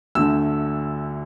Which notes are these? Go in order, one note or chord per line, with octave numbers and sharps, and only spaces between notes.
D2 D3 A3 E6